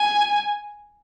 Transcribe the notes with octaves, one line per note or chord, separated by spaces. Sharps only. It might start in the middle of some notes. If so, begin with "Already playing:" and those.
Already playing: G#5